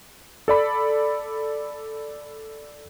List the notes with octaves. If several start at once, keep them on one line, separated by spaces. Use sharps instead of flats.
A4 D5 B5